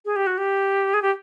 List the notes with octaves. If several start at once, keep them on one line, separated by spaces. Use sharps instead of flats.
G#4
G4
F#4
G4
G#4
G4